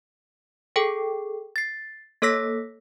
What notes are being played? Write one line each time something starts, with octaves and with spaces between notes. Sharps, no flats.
G#4 A4 G5
A6 C7
A#3 A4 C#5 E6 A#6 B6